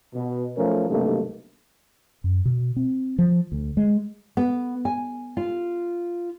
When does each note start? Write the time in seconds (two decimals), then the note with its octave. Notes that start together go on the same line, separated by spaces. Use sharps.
0.14 B2
0.57 B1 F3 A3 C#4 A#4
0.89 B1 G2 C3 D#3 A3 A#3
2.24 F#2
2.45 B2
2.76 C4
3.18 F3
3.52 D2
3.77 G#3
4.37 B3
4.85 G#5
5.37 F4